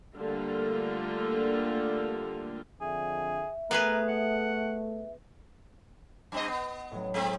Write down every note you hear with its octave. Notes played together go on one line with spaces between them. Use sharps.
D3 G3 A3 A#3 F4
F2 D3 G#4 E5
A3 B3 G#4 A#4 B4
F#5
G2 C4 D#5
B3
A2 F#3
G#3 C4